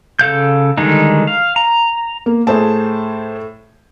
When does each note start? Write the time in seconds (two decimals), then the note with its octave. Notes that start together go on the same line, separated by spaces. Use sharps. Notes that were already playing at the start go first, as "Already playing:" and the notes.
0.19 C#3 A4 F5 G6
0.78 D3 D#3 G3 G#3 D#4
1.27 F5
1.56 A#5
2.26 A#3
2.47 A2 G#4 C5 A5